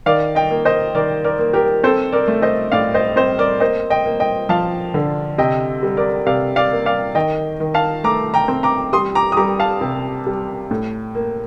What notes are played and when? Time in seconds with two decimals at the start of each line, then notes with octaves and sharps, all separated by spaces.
0.06 D#3 D5 F5
0.35 D#5 G5
0.51 A#3
0.65 C5 D#5
0.95 D#3 A#4 D5
1.24 A#4 D5
1.39 A#3
1.53 G4 A#4
1.83 C4 A4 C5
2.12 A#4 D5
2.28 A3
2.42 C5 D#5
2.72 A2 D5 F5
2.94 C5 D#5
3.16 C4 C5 D#5
3.38 A#4 D5
3.60 A#3 C5 D#5
3.90 D#5 G5
4.06 A#3
4.20 D#5 G5
4.49 F3 F5 A5
4.94 D3
5.38 C3 D#5 G5
5.83 G3
5.97 A#4 D5
6.26 C3 D5 F5
6.56 D5 F5
6.71 A#3
6.86 D5 F5
7.15 D#3 D#5 G5
7.60 D#3
7.74 F5 A5
8.04 A3 A#5 D6
8.34 G5 A#5
8.48 C4
8.63 A#5 D6
8.93 G3 C6 D#6
9.15 A#5 D6
9.32 D#6
9.37 G3 A#5 D6
9.60 F5 A5
9.81 C3
10.26 G3
10.71 A2
11.15 A#3